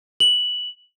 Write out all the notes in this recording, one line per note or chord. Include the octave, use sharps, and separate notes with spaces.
F#7